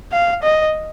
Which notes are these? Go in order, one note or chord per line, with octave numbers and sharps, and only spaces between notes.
F5
D#5